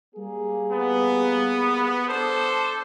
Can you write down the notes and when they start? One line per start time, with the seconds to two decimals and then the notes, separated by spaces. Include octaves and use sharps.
0.14 G3 A#3 G#4
0.71 B3
2.08 D4 A4 C5